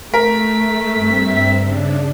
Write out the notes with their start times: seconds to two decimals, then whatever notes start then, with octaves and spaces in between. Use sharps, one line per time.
0.14 A3 A#4 B6
0.94 G2 C4 E5
1.58 C#3 D4